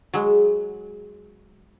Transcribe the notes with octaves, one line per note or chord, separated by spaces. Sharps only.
F#3 G#3